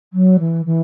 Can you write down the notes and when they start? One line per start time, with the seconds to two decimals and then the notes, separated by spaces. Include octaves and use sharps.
0.13 F#3
0.39 E3
0.66 E3